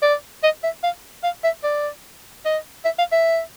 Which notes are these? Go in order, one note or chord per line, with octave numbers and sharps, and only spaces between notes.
D5
D#5
E5
F5
F5
E5
D5
D#5
E5
F5
E5